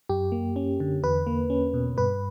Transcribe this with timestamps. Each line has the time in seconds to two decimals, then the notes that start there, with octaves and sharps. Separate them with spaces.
0.09 F#2 G4
0.32 A#3
0.56 C#4
0.80 D3
1.03 E2 B4
1.27 A#3
1.50 C#4
1.74 B2
1.97 G2 B4